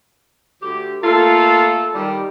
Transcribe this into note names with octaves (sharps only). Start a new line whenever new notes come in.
D2 G4
A3 A#3 F4 A4
D#3 G3